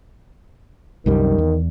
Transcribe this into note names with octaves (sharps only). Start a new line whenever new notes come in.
C2 F#2 D#3 G3
E2